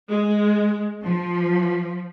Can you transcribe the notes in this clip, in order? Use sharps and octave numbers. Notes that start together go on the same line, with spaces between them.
G#3
F3